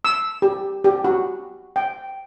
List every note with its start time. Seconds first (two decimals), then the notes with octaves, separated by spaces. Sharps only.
0.05 E6
0.42 G4
0.84 G4
1.04 F#4
1.76 G5